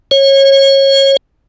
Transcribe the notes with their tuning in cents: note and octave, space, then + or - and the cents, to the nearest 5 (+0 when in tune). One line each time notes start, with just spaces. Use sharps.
C#5 -25